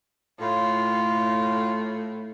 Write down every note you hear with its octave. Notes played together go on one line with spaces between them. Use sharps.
A2 F4